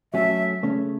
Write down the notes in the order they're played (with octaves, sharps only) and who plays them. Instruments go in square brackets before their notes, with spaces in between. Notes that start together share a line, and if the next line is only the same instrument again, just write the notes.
[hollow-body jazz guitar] F#3 A3 C#4 A4 [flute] E5
[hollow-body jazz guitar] C#3 A3 C#4